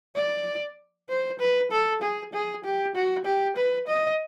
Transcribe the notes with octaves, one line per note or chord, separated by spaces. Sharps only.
D5
C5
B4
A4
G#4
G#4
G4
F#4
G4
B4
D#5